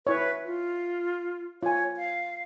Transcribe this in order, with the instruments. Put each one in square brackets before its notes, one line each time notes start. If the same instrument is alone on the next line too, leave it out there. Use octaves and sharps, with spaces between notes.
[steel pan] E4 C#5 [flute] B4
[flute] F4
[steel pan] F4 G#5 [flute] C#5
[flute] F5